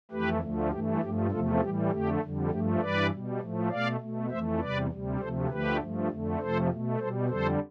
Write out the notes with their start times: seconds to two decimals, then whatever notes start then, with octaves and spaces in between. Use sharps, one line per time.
0.11 F2 E3 A3 G4 B4
0.41 D2 D3 F3 A3
0.70 G2 E3 A3 G4
1.01 G2 F3 A3 G4
1.30 E2 C3 F3 A3 F4 A4
1.61 A2 E3 G3 G4
1.90 F2 D3 A3 G4
2.21 F2 D3 G3
2.50 G2 F3 A3 G4
2.80 G2 E3 G3 B4 D5
3.10 B2 G3
3.40 A2 F3 A3
3.70 B2 A3 D5 F5
4.00 B2 A3
4.30 F2 E3 A3 C5 E5
4.60 E2 C3 G3 B4 D5
4.90 D2 C3 G3
5.19 D2 C3 F3 A3 A4 C5
5.50 D2 D3 F3 A3 G4 B4
5.80 G2 F3 A3
6.10 F2 D3 A3
6.40 F2 C3 F3 A3 A4 C5
6.70 B2 A3
6.99 B2 G3 A4 C5
7.29 F2 D3 G3 A4 C5